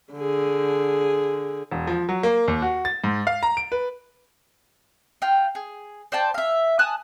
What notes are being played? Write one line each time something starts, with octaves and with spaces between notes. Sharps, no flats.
D3 G#4
E1
F3
F#3
A#3
D#2
F#4
A6
G#2
F5
A#5
D7
B4
F4 G5
G#4
C5 D5 G5 A5
E5 F5
G#5 A5 D#6 F#6